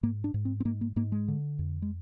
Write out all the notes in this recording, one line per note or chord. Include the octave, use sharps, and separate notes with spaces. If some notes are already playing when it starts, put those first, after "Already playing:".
G#2 A#3
D4
G#2
C4
C4
G#2 A#3
A#3
G#2 A#3
G#3
D3
F2
G#3